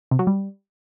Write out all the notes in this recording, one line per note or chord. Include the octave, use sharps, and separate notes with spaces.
C3
F#3
G3